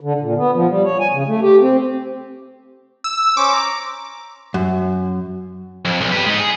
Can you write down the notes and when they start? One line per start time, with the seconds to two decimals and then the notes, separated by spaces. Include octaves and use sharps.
0.01 D3
0.21 A#2
0.37 B3
0.54 F3
0.69 G3
0.84 C#5
1.00 G#5
1.13 C#3
1.27 A3
1.42 G4
1.61 C4
3.04 E6
3.37 C#4 C5 C#6 D6
3.53 A#5
4.54 F#2
5.85 F2
6.01 B1
6.12 G4 B4
6.26 G#3 D#4
6.39 G#4